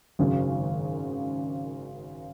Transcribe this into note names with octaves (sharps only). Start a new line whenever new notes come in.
G#1 F#2 C#3 F#3